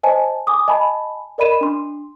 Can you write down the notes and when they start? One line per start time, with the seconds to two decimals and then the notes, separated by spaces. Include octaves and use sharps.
0.03 C5 D#5 G#5 A5
0.47 G#5 D6 D#6
0.68 D#5 G#5 A5 B5
1.38 A#4 D5 D#5 B5 D#7 E7
1.61 D4 C6